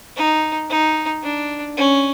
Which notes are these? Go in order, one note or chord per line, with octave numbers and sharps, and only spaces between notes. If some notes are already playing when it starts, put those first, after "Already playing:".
D#4
D#4
D4
C#4